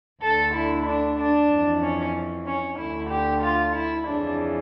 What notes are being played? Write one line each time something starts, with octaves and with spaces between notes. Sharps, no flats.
D2 D3 A4
E4
D4
D4
F2 E3
C#4
C#4
D2 D3 E4
G4
F4
E4
F2 C#3 E3 D4